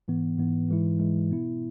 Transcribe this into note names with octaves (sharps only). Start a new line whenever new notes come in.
G#2 E3 B3
G#2 E3 B3
G#2 E3 G#3 E4
G#2 E3 G#3 E4
B2 B3 E4